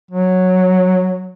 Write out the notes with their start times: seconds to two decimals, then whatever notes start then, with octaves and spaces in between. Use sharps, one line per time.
0.11 F#3